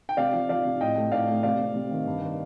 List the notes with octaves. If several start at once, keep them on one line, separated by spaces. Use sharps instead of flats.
G5
C3 D5 F5
F3
F3 D5 F5
C3
A2 D#5 G5
A3
A2 D5 F5
A3
C3 D5 F5
C3
C3
D#3
G2
D#3